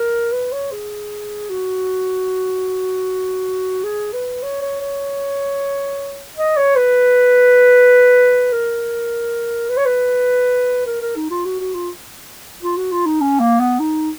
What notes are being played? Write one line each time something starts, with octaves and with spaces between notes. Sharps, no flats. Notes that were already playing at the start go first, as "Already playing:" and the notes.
Already playing: A#4
B4
C#5
G#4
F#4
G#4
B4
C#5
C#5
C#5
D#5
C#5
B4
A#4
B4
C#5
B4
A#4
A#4
D#4
F4
F#4
F#4
F4
F4
F#4
F4
D#4
C#4
A#3
B3
D#4